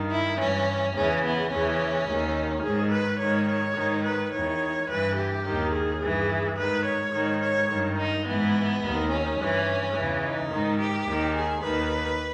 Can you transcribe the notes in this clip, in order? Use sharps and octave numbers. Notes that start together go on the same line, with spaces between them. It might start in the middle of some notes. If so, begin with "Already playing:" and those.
Already playing: G2 D#3
E4
G2 E3 C#4
E2 C#3 E3 C#4
B3
E2 C#3 E3 C#4
D#2 D#3
G#2 D#3 G#4
B4
G#2 D#3 C#5
C#5
G#2 D#3
B4
E2 D#3 C#5
G2 E3 B4
G4
D#2 D#3
G#4
G2 E3
G#2 D#3 B4
C#5
G#2 D#3
C#5
G2 D#3
D#4
G#2 E3 B3
D#2 D#3
C#4
G2 E3
E2 C#3 E3
D#4
G#2 D#3
G4
D#2 D#3
G#4
D#2 D#3 B4